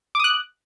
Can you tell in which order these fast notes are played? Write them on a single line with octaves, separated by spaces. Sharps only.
D6 D#6 F#6